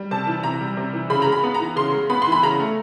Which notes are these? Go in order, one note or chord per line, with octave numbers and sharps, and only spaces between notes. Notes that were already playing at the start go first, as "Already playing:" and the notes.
Already playing: G3
C3 A5
E3
C3 A#5
G3
C3
E3
C#3 B5
G#3 A#5
B5
B3
A#5
E3
C#3 C6
G#3
B3 B5
E3 C6
B5
C#3 A#5
A3